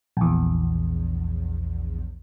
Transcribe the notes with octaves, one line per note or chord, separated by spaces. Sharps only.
A#1 E2